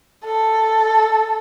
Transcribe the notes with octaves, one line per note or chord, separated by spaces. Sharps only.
A4